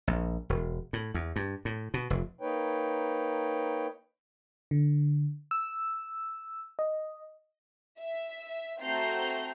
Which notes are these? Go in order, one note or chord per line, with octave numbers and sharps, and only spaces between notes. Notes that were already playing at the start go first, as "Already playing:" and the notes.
A#1
E1
A2
E2
G2
A2
B2
F1
A#3 D#4 B4 C#5 G5
D3
E6
D#5
E5
A3 C4 F#4 A#5 G6 C7